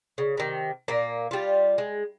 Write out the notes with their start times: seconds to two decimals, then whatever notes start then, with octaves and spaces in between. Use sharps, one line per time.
0.18 C#3
0.37 C3 D#3
0.88 A#2 A#3
1.31 G3 F4
1.78 G#3